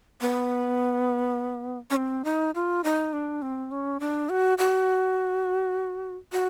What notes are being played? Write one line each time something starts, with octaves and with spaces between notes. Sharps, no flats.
B3
C#4
C4
D#4
F4
D#4
D4
C4
C#4
D4
F#4
F#4
F#4